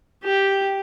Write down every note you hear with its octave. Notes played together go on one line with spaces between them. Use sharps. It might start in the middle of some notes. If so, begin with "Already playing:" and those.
G4